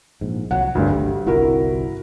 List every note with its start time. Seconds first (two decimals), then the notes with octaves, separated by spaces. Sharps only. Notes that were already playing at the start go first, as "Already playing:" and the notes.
0.21 A#1 G#2
0.51 C2 F#3 F#5
0.75 G#1 D2 G2 D4
0.91 G3
1.27 G1 C2 E4 F#4 A#4